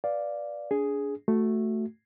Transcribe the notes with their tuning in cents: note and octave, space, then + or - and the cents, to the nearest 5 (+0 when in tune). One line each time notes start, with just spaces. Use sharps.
B4 +0 D5 +0 F5 +0
D4 -35 G#4 +0
A3 +0 F#4 +0